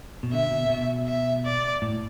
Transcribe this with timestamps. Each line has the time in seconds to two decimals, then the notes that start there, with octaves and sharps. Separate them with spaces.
0.23 B2
0.32 D3 E5
0.51 B2
0.70 B2
1.07 E5
1.45 D5
1.82 A2